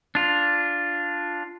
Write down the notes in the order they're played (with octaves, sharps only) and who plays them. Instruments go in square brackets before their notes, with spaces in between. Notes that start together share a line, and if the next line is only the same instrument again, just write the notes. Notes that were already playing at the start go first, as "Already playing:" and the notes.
[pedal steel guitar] D4 F4